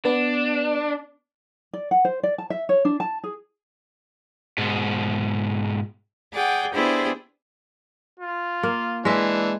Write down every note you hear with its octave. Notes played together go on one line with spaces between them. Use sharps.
B3 D4
D5
F#5
C5
D5
A5
E5
C#5
D4
A5
G#4
G#2 B2
G#4 D5 F#5 G5
B3 D4 E4 G4 G#4 C5
F4
A#3
E3 G#3 D4 E5